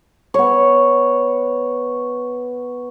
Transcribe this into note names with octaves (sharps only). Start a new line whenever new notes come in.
B3 C#5